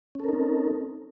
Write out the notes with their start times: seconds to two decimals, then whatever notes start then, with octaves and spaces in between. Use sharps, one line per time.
0.15 C#4
0.20 A4
0.24 A#4
0.29 D#4
0.33 C4